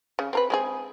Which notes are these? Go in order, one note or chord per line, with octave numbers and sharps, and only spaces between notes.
C#3
C4 A#4 B4
G#3 C4 G#4